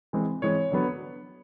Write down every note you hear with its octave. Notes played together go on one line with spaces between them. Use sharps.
E3 G#3 C4
E3 G#3 C4 C#5
D3 F#3 B3